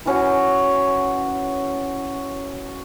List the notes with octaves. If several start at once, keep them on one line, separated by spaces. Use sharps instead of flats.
E3 C#4 F#4